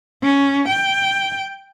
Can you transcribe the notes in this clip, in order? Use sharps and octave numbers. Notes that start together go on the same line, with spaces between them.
C#4
G5